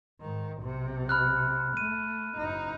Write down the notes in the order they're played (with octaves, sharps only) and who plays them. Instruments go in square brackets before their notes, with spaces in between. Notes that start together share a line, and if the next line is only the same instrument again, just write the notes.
[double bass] G#2 D#3
B1 C3
[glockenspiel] B5 F6 F#6
[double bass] A3 [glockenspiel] D#7
[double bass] F#1 D#4